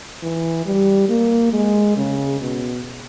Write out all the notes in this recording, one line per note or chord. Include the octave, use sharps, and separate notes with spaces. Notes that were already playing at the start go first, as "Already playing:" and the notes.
E3
G3
A#3
G#3
C#3
B2